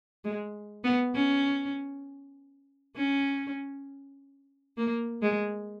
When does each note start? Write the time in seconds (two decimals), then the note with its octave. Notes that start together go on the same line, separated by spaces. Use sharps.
0.24 G#3
0.84 B3
1.15 C#4
2.96 C#4
4.77 A#3
5.22 G#3